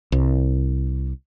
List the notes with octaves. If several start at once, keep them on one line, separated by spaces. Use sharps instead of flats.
C2